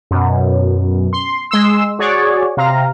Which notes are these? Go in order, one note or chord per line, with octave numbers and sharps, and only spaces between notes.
F#2 B2
C6
G#3 C6 E6
F#4 G#4 C#5 D5
C3 F5 A#5